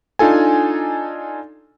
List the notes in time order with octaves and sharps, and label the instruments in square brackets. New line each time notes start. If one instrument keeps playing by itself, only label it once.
[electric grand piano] D4 D#4 F4 A4 G#5